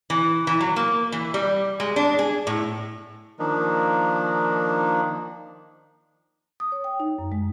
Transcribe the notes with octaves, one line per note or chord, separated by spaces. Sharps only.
E3
E3
F#3
A#3
E3
G3
G#3
D4
G#4
A2
D#3 F3 A#3 D4 D#4
D#6
C#5
G5
D#4
F#2
G#3